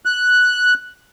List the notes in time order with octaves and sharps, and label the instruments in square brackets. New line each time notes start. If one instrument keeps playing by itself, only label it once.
[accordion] F#6